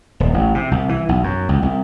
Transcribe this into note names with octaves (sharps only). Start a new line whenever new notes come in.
D#1
A1
C3
C2
E3
B1
F#2
C#2
C2